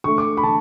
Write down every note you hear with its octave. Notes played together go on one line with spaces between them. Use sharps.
D3 A3 C#6
D6
B5
D3 A5